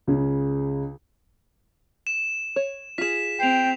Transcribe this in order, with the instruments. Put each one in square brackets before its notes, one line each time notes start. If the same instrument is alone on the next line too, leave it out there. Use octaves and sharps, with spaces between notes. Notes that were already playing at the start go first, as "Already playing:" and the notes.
[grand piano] C#2 C#3
[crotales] E7
[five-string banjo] C#5
[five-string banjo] F4 G#4 [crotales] B6 E7
[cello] C4 [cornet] G5 [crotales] C7 F7